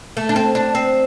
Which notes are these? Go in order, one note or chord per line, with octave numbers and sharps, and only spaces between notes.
A3
D4
C4
D4
C4